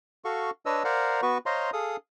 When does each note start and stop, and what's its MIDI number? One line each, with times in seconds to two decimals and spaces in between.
0.25 0.50 66
0.25 0.50 69
0.25 0.50 77
0.25 0.50 85
0.66 0.83 62
0.66 0.83 71
0.66 0.83 73
0.66 0.83 75
0.66 0.83 88
0.84 1.21 70
0.84 1.21 72
0.84 1.21 74
0.84 1.21 77
0.84 1.21 78
0.84 1.21 82
1.22 1.38 59
1.22 1.38 66
1.22 1.38 71
1.22 1.38 85
1.46 1.70 72
1.46 1.70 73
1.46 1.70 75
1.46 1.70 77
1.46 1.70 82
1.46 1.70 84
1.73 1.96 68
1.73 1.96 69
1.73 1.96 77
1.73 1.96 87